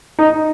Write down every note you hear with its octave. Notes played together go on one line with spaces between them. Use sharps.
D#4